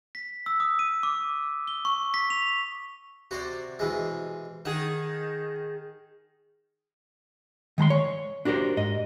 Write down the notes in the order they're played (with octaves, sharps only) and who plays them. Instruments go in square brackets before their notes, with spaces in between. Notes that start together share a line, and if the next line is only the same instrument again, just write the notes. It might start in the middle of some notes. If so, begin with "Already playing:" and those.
[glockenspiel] B6
E6
D#6
D#7
D6
G7
C#6
B6
F7
[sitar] C3 [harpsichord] F#4 C5 D5
[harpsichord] B2 E3 G#3
[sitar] D#3 G#4 [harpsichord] F#5
[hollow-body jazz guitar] D#3 G#3 A#5 C6
C#5
D4 F#4 G4 A#4 C5
G#2 D#5